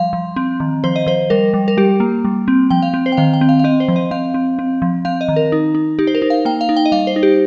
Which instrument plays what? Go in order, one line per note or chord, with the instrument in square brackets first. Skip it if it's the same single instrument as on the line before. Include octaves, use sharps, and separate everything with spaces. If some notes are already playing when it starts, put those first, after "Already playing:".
Already playing: [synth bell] F3 G3 F5
F3
C4
D#3
F3 C5
D#5
F3 C5
G3 A#4
G3
A#4
G3 G4
A#3
G3
C4
F3 G5
F5
C4
C5
G5
D#3 F5
G5
C4
F5
F5
C4 D#5
C5
F3
D#5
C4 F5
C4
C4
F3
C4 F5
D#5
D#3
A#4
D#4
D#4
D#4 G4
C5
A#4
D#4
F5
A#3 G5
F5
D#4
G5
D#5
G3 F5
C5
D#4
G4